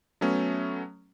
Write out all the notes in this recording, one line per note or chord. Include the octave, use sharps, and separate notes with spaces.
F#3 A3 B3 C#4